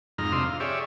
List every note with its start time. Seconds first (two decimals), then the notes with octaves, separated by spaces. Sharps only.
0.18 F2 G#2 D#4 A#5 F6
0.32 F2 C3 D4 D#5 C6 E6
0.44 F5
0.60 G4 G#4 C#5 D5 E5